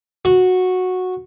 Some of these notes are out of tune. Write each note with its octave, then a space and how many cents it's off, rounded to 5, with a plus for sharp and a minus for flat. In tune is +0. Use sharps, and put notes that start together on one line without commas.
F#4 -10